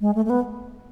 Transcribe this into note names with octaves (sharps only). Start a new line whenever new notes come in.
G#3
A3
A3
B3